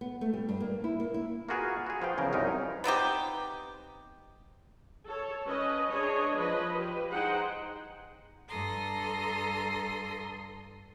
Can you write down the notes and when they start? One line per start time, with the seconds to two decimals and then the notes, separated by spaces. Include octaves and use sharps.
0.01 B3
0.21 A3
0.33 G3
0.49 G2
0.60 A#3
0.84 E4
1.00 A#3
1.14 E4
1.49 A#3 F4 F#4 G#4 A#4 B4
1.86 F#4 G#4
2.02 F3 B4 F5 G5
2.18 E2 C#3 F3 A#4
2.33 C2 F#2 D#4 A#4 B4 G#5
2.84 B3 C4 D#4 G4
5.07 A4 C#5
5.47 C#4 B4 D#5
5.91 D4 G#4 C#5 D#5
6.38 F3 B4 D#5
6.77 G4 B4
7.11 D#4 G#4 C5 F#5 G5
8.48 G2 A4 A#5 C6 D#6